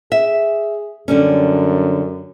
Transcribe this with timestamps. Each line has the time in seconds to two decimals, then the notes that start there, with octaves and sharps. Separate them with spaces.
0.12 G#4 E5
1.08 F#2 D3 G3 C#4